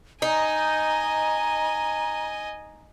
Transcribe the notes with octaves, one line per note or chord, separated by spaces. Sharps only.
D#4 D#5 G#5 A#5